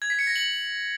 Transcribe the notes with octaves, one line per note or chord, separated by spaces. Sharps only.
G#6
B6
C#7
A#6
F#7